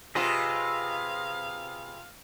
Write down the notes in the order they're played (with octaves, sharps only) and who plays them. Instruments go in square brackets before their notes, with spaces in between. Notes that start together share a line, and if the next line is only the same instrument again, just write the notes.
[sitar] C3 F4 [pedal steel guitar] G#4 B4 D#5 [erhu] F5